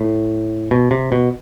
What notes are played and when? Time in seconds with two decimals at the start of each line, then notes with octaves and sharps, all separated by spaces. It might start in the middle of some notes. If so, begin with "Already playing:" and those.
Already playing: A2
0.71 B2
0.91 C3
1.12 B2